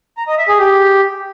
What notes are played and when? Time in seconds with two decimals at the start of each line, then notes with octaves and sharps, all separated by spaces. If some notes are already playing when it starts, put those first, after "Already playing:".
0.17 A#5
0.28 D#5
0.38 E5
0.48 G#4
0.59 G4